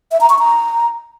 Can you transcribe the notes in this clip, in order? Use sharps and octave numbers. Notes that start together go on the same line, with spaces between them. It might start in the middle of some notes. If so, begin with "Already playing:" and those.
E5
A#5
C#6
A#5